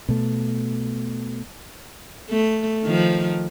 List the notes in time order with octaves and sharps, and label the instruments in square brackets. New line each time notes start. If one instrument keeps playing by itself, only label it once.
[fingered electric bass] B2 A3
[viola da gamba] A3
D#3 F3